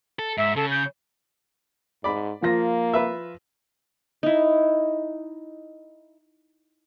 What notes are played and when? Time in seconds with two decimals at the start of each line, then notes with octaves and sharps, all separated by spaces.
0.19 A4
0.38 G#2 E5
0.56 C#3 A4
0.71 G6
2.04 G#2 D5 B5
2.42 F3 A#3 F4 A#6
2.94 B4 E5
4.23 D#4 E4